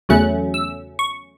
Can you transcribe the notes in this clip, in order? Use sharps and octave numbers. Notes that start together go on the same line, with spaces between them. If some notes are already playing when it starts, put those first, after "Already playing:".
E2 C#3 F#3 A3 C#4 F#6
E6
C#6